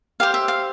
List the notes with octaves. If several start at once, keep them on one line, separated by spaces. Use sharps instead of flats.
G4 C5 F5
E5
F5